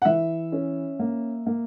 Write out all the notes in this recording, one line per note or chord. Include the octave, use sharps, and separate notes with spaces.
F#5
E3 E5
C#4
A#3
A#3